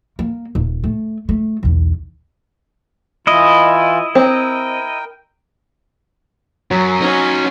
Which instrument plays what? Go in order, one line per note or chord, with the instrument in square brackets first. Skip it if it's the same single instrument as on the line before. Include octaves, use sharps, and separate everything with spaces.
[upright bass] A#3
D#1
A3
A3
B1 E2
[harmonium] E3 F4 [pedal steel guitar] E4 D#5
[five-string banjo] C4 [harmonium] A#4 G5
[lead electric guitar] F#2 [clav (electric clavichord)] F#3
[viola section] C#4 [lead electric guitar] D#4 F#4